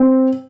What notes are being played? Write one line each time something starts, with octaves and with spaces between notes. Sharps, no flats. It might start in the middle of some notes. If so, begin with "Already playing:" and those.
Already playing: C4